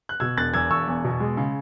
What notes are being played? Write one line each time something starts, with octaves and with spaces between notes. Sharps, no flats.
F#6
B2 E6 G#6
E1 F#6 A6
E2 E6 G#6
E1 C#6 E6
E2
B2
G#3
C#3